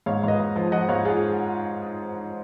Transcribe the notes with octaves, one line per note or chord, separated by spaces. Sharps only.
G#2 C#5 F5
G#2 B4 D#5 F5
G#2
F3
F3 D#5 F#5
G#2 C#5 F5
F4 G#4